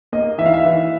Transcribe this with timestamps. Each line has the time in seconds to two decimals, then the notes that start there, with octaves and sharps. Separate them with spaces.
0.12 A#3 D#5
0.38 E3 E5
0.46 F5
0.54 E5
0.65 E3